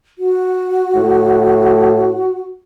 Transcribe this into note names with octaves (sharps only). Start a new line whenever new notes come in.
F#4
A2